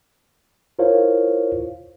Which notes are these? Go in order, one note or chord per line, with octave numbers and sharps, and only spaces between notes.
E4 F4 A#4 C5 C#5 F5